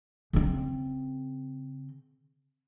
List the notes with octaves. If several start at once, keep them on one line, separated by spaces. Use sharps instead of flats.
C#3 C4